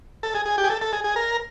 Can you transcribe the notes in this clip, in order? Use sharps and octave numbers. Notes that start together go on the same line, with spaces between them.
A4
G#4
G#4
G4
G#4
A4
A4
G#4
G#4
A#4